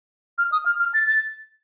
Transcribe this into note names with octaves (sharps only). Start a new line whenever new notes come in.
F6
D#6
F6
F6
A6
A6